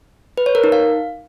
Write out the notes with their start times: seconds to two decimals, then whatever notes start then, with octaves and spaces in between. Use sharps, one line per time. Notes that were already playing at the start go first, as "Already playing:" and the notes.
0.38 B4
0.46 C#5
0.55 A#4
0.64 D#4
0.72 F5